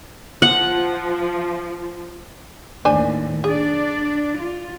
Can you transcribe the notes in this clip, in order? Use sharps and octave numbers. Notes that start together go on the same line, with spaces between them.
F3 F#5
D#2 A2 D#3 D4 C5 G#5
D4 G#4 D5
F4